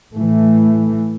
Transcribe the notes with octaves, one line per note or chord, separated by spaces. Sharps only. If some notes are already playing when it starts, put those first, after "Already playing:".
A2 E3 A3